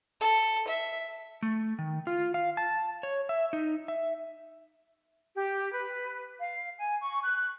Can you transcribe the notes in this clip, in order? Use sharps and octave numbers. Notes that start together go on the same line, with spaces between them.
A4
E5
A3
D#3
F4
F5
A5
C#5
E5
D#4
E5
G4
B4
F5
G#5
C#6
F#6